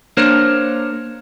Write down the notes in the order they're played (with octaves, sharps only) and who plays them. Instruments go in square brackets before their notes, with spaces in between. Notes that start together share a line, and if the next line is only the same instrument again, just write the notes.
[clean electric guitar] A#3 D4 A#4 C5 C#5